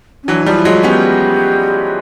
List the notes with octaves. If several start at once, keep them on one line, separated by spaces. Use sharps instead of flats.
C#4
E3 F#3 D4
F3 G3 D#4
E4
F#3 G#3 F4
B3 C#4 G4